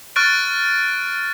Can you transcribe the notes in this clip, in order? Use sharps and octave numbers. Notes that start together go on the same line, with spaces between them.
C#6 F6 F#6 A6 D7